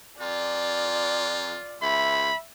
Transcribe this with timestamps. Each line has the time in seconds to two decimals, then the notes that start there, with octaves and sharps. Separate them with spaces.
0.20 F2 F4 D5
1.82 C#2 E5 B5